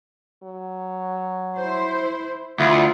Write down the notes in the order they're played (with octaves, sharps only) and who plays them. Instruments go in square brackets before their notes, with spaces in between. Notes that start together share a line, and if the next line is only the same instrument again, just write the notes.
[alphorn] F#3
[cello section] E4 C5
[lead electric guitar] D2 [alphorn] E4 [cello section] F4